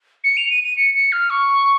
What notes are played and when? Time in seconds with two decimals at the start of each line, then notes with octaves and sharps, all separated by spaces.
0.24 C#7
0.37 F7
0.50 D#7
0.64 D#7
0.77 C#7
0.95 C#7
1.12 F6
1.30 C#6